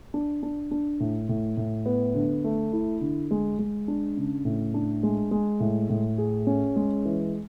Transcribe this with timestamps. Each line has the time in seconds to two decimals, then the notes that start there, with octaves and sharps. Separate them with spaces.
0.14 D4
0.43 D4
0.71 D4
1.00 A2
1.29 A2
1.57 A2
1.86 B3
2.15 D3
2.44 A3
2.73 E4
3.01 D3
3.31 G#3
3.59 G#3
3.88 D4
4.17 C#3
4.45 A2
4.74 D4
5.03 G#3
5.31 G#3
5.60 A2
5.89 A2
6.18 G#4
6.47 C#4
6.76 G#3
7.05 E3